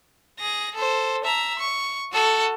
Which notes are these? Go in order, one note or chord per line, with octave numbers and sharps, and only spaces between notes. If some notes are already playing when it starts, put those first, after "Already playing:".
G#4 A#6
A4 C5
E5 A#5
C#6
F#4 A4